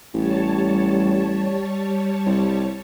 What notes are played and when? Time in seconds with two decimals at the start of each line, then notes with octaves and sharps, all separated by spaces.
0.14 A1 G3 C#5 A5
2.26 C2